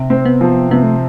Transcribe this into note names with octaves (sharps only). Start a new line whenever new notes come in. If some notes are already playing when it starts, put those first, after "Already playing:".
Already playing: C3
C4
B3
F3
C3 B3
A3